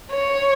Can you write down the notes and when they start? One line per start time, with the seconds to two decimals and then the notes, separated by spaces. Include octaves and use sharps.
0.12 C#5